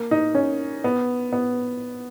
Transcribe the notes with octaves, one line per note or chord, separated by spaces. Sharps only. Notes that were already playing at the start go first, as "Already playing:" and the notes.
Already playing: A#3
D#4
C#4
B3
B3